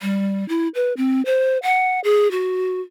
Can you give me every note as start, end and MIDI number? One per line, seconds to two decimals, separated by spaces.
0.01 0.47 55
0.49 0.68 64
0.75 0.93 71
0.97 1.22 60
1.26 1.58 72
1.63 2.00 78
2.04 2.30 68
2.31 2.80 66